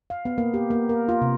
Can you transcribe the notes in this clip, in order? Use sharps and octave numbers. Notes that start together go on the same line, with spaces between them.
F5
B3
A#3
G4
A#3
A#4
F4
C3